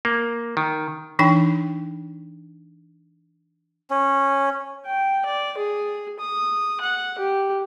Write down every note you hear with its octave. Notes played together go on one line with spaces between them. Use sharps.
A#3
D#3
E3 D4 D#4 G5
C#4
G5
D5
G#4
D#6
F#5
G4